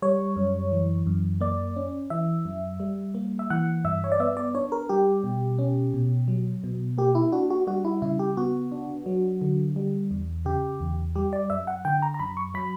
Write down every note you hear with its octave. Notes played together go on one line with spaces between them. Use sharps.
G3 C#5
F#2
E3
F#2
A#3 D5
C#4
E3 E5
F#2
G3
A#3
E5
E3 F#5
G2 E5
C#5
D5
B3 E5
D5
D4 C#5
A#4
G3 G4
B2
C#4
B2
F#3
B2
A#3 G4
E4
D4 F#4
F#4
G3 F#4
E4
C#3 E4
G4
B3 F#4
D4
F#3
D3
G3
E2
C#3 G4
E2
G3 G4
D5
F#2 E5
F#5
D3 G5
A#5
A#5
F#2 B5
C#6
F#3 B5